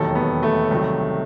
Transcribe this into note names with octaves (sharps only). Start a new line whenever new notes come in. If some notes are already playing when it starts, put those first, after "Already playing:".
Already playing: E1 D#2 D#3 F#3 A4
B3
A3
C2 C3 D#3 F#3